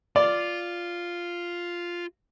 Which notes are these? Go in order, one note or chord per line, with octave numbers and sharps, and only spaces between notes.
F4 D5